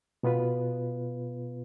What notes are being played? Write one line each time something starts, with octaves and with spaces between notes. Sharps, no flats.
B2 B3 F4 B4